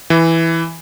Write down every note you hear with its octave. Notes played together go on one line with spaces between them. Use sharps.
E3